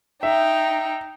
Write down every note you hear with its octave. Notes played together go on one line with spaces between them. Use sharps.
D#4 E5 G5